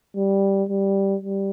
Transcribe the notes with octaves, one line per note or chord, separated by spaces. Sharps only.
G3
G3
G3